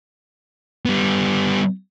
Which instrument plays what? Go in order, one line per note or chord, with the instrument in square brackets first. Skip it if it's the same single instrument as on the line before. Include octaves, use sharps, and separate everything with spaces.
[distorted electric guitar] G3 B3